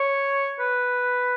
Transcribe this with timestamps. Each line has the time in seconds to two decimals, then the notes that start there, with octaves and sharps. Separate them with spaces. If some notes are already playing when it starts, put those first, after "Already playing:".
Already playing: C#5
0.59 B4